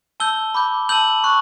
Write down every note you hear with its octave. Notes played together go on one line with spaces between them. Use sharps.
A5 E6 G6 G7
B5 D6 G6
A5 E6 G6 F#7
C#6 F#6